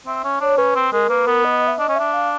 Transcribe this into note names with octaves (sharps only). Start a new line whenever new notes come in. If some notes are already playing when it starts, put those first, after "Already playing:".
C4 E5
C#4
D4 C#5
C#4 B4
C4
G#3 A#4
A#3 B4
B3 A#4
D#5
E5
D4 D#5
C#4
D4 E5
F5